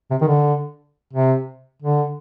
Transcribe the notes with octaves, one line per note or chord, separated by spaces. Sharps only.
C3
D#3
D3
C3
D3